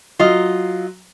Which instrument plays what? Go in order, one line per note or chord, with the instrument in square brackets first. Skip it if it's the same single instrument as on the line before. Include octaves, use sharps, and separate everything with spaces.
[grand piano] F#3 [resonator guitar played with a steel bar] F4 D#5